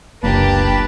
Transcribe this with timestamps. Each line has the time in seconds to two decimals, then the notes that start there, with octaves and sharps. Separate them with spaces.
0.23 F#1 C#2 A#3 D4 G4 B4 A5